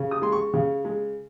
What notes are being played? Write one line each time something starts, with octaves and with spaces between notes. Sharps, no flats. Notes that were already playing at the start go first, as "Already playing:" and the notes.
Already playing: C#3
D#6
G#3 C6
C#6
C#3
G#3